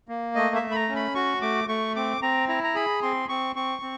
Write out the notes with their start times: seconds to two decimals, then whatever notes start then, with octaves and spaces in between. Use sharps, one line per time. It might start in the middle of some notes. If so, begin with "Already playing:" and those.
0.08 A#3
0.35 A3 D#5
0.55 E5
0.62 A3
0.71 B5
0.76 A#5
0.89 C#4
0.96 B5
1.15 F#4 C#6
1.42 A3 D6
1.68 A3 C#6
1.96 C4 D6
2.22 C4 A#5
2.48 E4 A#5
2.64 A#5
2.75 G#4 B5
3.02 C4 C6
3.29 C4 C#6
3.56 C4 C#6
3.82 C4